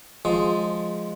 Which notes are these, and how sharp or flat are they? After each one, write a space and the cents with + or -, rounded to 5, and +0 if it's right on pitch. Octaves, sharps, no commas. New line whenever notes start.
F3 +10 G#3 +0